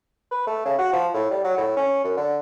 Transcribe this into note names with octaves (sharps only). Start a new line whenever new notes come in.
B4
A3
C#3
F#4
F3
A2
G3
F#3
A2
C#4
F#2
D3